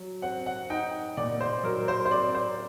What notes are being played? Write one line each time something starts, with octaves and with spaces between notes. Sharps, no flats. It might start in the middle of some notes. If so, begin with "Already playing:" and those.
Already playing: F#3
C4 F#5
F#5
D#4 G5
A#2 D5
C5
F#3 A#4
C5
C5
C4 D5
C5